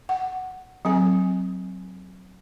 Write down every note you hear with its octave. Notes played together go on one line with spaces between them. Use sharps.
F#5
F#3 C4 G#5